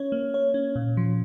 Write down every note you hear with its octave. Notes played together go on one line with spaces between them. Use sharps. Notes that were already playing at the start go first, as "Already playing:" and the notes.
Already playing: C#4 C#5
A#3
C#5
C#4
A#2
F3